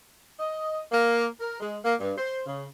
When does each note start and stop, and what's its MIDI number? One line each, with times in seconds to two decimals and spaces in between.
0.39 0.80 75
0.92 1.26 58
1.40 1.59 70
1.60 1.78 56
1.85 1.95 58
2.00 2.13 43
2.18 2.42 72
2.46 2.65 49